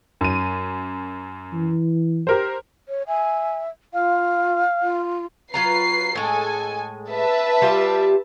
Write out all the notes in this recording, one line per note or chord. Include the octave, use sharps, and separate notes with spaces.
F#2 D#7
E3
G4 A#4 C5
C#5
E5 G#5
F4 F5
F4
F#3 F4 B4 A#5 C7
A2 G#3 A4 G#5
B4 E5 A5
G3 F4 G4